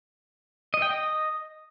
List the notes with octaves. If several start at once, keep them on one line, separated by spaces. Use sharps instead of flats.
D#5
G5
D#5